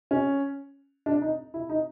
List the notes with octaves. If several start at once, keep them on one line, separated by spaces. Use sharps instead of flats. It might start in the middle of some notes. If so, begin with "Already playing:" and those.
C#4
D4
D#4
E4
D#4